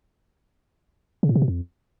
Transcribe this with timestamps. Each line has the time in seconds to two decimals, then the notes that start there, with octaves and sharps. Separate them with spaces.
1.23 C#3
1.29 A2
1.36 C3
1.42 B2
1.48 F2